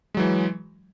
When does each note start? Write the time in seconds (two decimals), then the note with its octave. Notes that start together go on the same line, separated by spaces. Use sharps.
0.14 G#3
0.17 F#3
0.20 E3